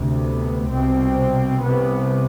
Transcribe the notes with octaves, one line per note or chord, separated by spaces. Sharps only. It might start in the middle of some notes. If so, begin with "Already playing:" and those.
Already playing: D2 C3
B3
C2 B2 C4
C2 C3 B3